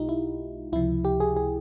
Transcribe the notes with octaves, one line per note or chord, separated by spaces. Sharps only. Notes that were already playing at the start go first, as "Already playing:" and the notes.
Already playing: B1 B2 G#3 D#4 F4 G4
E4
C#2 C3 F3 E4
G4
G#4
G#4